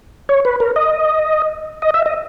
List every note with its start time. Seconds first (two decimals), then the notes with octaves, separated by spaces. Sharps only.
0.29 C#5
0.45 B4
0.60 A#4
0.76 D#5
1.82 D#5
1.94 E5
2.06 D#5